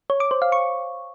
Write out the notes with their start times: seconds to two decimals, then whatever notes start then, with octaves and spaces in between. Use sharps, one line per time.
0.10 C#5
0.20 D6
0.31 C5
0.42 F5
0.52 C#6